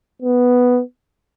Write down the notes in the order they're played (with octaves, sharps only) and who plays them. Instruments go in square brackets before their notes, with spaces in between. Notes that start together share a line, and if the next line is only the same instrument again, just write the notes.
[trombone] B3